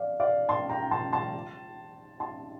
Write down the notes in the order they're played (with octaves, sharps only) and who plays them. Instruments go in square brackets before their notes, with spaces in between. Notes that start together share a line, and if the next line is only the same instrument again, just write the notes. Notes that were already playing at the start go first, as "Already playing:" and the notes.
Already playing: [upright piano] D5 F5
D5 F5
A5 C6
G5 A#5
A5 C6
A5 C6
A5 C6